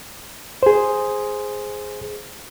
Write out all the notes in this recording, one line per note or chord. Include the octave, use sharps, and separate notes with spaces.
G#4 C5